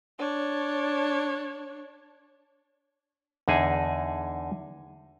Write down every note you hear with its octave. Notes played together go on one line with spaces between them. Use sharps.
D4 C#5
E2 D3 D#4 G#4 G#5